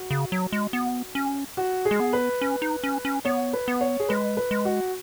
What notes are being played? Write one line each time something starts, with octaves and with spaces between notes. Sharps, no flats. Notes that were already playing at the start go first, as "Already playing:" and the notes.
Already playing: F#4
C#3
F#3
G#3
B3
C#4
F#4
G#4
G#3
B3
B4
C#4
D#4
C#4
C#4
B3 C#5
B4
B3
C#5
G#4
G#3 B4
B4
G#3
F#4